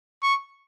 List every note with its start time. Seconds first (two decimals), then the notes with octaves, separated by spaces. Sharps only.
0.23 C#6